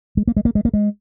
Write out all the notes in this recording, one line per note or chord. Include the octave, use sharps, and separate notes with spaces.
G#3
A#3
G#3
A#3
G#3
A#3
G#3